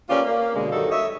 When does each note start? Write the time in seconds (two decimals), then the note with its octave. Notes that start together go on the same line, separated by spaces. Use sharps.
0.10 A#3 C#4 F4 G4 B4 D5
0.26 A#3
0.55 B2 D3 G#3
0.72 G2 D#3 F#3 D#4 F#4 A4
0.91 C#5 D#5 E5